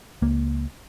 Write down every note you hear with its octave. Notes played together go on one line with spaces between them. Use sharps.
C#2 A#3